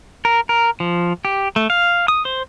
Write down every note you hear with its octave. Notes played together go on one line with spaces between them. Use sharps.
A#4
A#4
F3
G4
A3
F5
D#6
C5